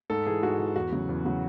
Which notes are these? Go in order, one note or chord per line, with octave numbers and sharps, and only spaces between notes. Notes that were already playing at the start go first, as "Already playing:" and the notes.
G#2 A4
E3 G#4
G#2 F#4
E3
E2 F#4
C#3 F#3
E2
C#3 F#3